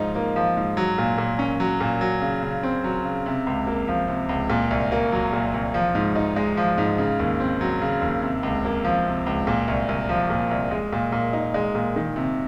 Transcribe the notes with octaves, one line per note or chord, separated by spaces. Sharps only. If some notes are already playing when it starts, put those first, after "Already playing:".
Already playing: G#2 F3 D#4
A#3
F3
G#2
F#3
A#2
A#2
C#4
F#3
A#2
F#3
C#3
C#3
C4
F#3
C#3
C3
C#2
A#3
F3
C3
C#2
A#2
C2
A#3
F#3
A#2
C2
F3
G#2
D#4
G#3
F3
G#2
C#3
D#2
C4
F#3
C#3
D#2
C3
C#2
A#3
F3
C3
C#2
A#2
C2
C2
F3
A#2
C2
G#3
A#2
A#2
D#4
G#3
A#2
D#3
C3